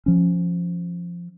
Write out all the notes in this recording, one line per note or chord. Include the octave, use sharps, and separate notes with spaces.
F3 C#4